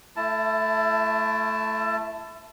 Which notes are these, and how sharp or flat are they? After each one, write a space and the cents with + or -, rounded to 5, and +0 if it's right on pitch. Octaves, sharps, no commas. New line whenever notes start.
A3 -10 E4 +30 A5 +0